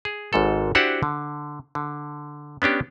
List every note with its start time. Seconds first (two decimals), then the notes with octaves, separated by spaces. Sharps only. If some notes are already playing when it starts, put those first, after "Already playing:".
0.05 G#4
0.33 G#1 G#2 A4
0.75 D4 E4 F#4 G4 C5 F#5
1.03 D3
1.75 D3
2.62 B3 C#4 D4 G4